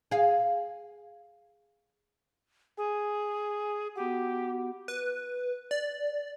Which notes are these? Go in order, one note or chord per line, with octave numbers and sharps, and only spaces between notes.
G#4 F5
G#4 G#5
B3 F#4 G4 F#5
B4
D5